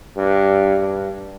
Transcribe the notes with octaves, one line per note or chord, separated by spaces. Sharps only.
G2
G2